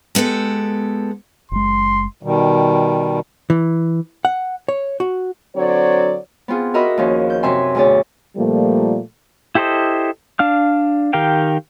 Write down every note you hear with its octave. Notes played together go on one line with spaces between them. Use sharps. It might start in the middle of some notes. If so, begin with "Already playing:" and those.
G#3 B3 G4 A4
F#1 G#3 C6
B2 D#3 G3
E3
F#5
C#5
F#4
D3 F#3 C4 C#5 D5
B3 C4 F4 G#4
F#4 A#4 D#5 E5 B5
D#2 F3 C#4
G6
F#2 C3 C4 E5 G#5 C6
D2 B2 G#4 C#5 D5
A#2 F3 G3 A3 A#3
E4 G4 A4 C5 D#5
D4 F5 F6
D#3 G4 A#4 F5 G5